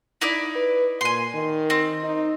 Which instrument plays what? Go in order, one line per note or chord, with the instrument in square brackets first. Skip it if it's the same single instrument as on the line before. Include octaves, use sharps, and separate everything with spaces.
[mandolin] D#4 E4 D5
[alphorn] B4
[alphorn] A#2 [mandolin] G#5 C6
[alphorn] D#3
[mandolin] C4
[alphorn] D#4